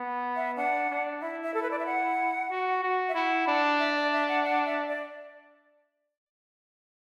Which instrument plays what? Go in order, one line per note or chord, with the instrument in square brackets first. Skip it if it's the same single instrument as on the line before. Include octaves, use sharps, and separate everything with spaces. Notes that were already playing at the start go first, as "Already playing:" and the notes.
Already playing: [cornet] B3
[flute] E5
[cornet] D4 [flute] F#5
[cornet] D4
[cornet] E4 [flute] E5
[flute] E5
A4
B4
D5
E5
F#5
[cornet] F#4
F#4
[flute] E5
[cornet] E4 [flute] F#5
[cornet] D4
[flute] E5
D5
E5
F#5
F#5
E5
D5